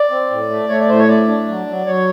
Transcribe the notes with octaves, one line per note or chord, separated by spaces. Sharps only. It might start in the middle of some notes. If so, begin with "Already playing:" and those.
Already playing: D5
C4
A2
A3
A3 C#5
D5
A2 C5
C#5
A3 D5
D4
F#3
F#3
F#3 C#5